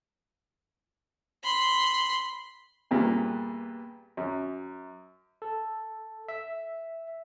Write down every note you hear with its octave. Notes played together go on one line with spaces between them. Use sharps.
B5 C6
E2 G2 A#2
F#2
A4
E5